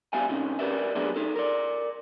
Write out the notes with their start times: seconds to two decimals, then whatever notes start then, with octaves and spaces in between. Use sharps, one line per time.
0.13 G3 B3 E5 F5 G#5
0.29 C3 C#4 D#4
0.59 G4 A#4 B4 D5 E5
0.95 F#3 B3 D4 G#4 B4 D5
1.16 D#4 A4
1.35 A#4 D5